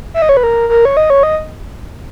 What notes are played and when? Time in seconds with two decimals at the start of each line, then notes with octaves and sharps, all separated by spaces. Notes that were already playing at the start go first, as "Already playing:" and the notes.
0.14 E5
0.22 D#5
0.29 C#5
0.37 B4
0.43 A#4
0.69 A#4
0.85 C#5
0.97 D#5
1.10 C#5
1.23 D#5